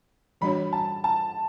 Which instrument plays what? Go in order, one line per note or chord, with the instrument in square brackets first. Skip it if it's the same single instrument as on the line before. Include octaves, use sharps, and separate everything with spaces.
[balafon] E3 G3 D4 F#4 C#5 [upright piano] B5
[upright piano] A5
A5